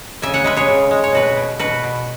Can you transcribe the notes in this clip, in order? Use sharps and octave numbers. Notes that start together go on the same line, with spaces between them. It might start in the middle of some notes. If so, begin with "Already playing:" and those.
C#3 E5 G#5
C#5 F#5
G#3 B4 E5
G#4 C#5
C#3
G#3
C#5
B2 F#4 B4
B2
B2 F#4 B4
B2